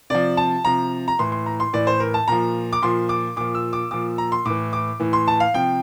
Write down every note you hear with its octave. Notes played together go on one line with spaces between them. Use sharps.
C3 F3 D5
A5
C3 F3 A#5
A#5
A2 E3 C6
C6
A#5
C6
A2 E3 D5
C5
A#4
A5
A#2 F3 A#5
D6
A#2 F3 C6
D6
A#2 F3 D6
E6
D6
A#2 F3 D6
A#5
C6
A2 E3 D6
D6
A2 E3
C6
A5
F5
C3 F3 G5